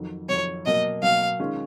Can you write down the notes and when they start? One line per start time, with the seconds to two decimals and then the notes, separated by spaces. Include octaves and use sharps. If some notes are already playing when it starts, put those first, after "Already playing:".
Already playing: F2 D#3 F#3
0.29 F2 D#3 F#3 C#5
0.66 B2 F#3 A#3 D#5
1.03 B2 F#3 A#3 F5
1.40 D#3 G#3 C#4 F4